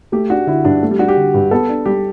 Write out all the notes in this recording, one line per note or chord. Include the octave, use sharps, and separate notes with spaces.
A3 G4
D4 F#4
D3 E4
G2 D4
A3
G3
D4 F#4
G4
D3
G2
B3 A4
D4
G3 G4